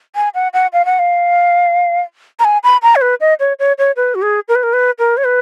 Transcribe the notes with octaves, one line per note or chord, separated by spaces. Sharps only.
G#5
F#5
F#5
F5
F#5
F5
A#5
G#5
B5
A#5
C#5
B4
D#5
C#5
C#5
C#5
B4
F#4
G#4
A#4
B4
A#4
B4
A#4
C#5
B4